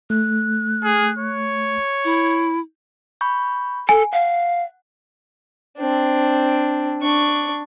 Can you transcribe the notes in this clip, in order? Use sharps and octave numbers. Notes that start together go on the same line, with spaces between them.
A3 F#6
G#4
C#5
E4
B5 C#6 G6
A4 G#5
F5 F#5
C4 D4
D4 C#6